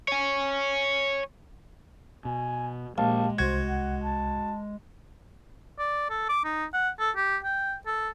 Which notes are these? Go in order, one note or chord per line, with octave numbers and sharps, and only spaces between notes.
C#5 G#5
B2 G#5
A#1 G#3 G4 F5 A5
C2 F#4 C5 G#6
F#5
A5
D5
A4
D6
D#4
F#5
A4
G4
G5
A4